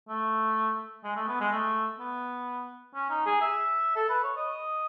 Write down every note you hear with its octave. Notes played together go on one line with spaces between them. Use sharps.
A3
G#3
A3
B3
G#3
A3
B3
C#4
D#4
G#4
E5
A4
B4
C#5
D#5